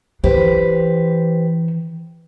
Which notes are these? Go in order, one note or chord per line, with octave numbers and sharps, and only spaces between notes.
E3 G4 B4 C5